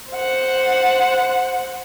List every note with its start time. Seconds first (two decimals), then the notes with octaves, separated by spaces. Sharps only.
0.12 C5 F#5